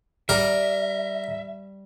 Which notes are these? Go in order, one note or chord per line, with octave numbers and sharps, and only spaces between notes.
G3 A#4 E5